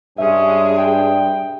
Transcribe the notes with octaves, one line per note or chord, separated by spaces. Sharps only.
G2 G#3 C#4 G#4 E5
G5